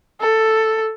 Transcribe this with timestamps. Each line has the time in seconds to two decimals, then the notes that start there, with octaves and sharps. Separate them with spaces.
0.21 A4